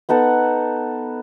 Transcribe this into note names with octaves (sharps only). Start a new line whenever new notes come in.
B3 D#4 A4 F#5